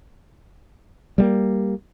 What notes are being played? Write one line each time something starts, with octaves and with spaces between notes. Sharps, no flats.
G3 G#3 A#3